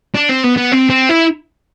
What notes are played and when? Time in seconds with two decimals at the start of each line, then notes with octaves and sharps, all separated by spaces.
0.15 D4
0.29 C4
0.43 B3
0.56 B3
0.72 C4
0.90 C4
1.09 E4